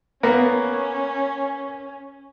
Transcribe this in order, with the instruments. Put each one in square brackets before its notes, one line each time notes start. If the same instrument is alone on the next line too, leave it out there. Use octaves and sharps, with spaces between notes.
[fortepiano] A#3 B3 [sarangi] C#4